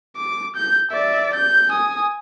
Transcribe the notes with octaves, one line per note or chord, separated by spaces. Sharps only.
D6
G6
D5 E5
G6
G#5 D#6